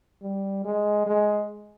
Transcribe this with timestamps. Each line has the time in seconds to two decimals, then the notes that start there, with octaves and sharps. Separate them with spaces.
0.22 G3
0.65 G#3
1.07 G#3